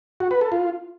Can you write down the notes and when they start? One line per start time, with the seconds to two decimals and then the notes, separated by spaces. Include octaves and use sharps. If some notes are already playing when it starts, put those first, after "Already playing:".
0.20 F#4
0.31 B4
0.41 A4
0.52 F4